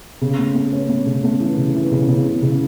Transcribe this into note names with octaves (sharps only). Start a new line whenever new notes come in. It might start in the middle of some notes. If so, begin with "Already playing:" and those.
C#3
A3
A3
C#4
A3
C#3
A3
E3
C#3
E3
C#3
C#3
C#3
C#3